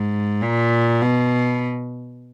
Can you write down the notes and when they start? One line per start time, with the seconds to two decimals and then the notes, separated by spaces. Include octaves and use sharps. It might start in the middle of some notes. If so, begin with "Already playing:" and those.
Already playing: G#2
0.41 A#2
1.02 B2